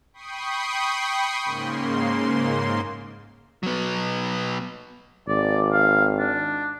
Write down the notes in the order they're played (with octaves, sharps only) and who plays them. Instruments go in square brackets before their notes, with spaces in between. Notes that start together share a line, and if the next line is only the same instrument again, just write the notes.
[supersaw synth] G5 B5 C#6 D#6 C7
G#2 C#3 A#3 C6
[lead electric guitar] F#3 B3
[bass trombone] G#1 [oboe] D5
[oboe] F5
D4